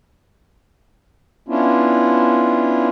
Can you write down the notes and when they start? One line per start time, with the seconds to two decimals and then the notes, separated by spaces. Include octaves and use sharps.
1.49 B3 C#4 D4 E4 F4